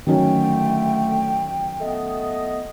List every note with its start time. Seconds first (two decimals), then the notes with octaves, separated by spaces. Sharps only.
0.07 D3 D#3 F#3 A3 C#4 G5
1.80 A3 B3 D#5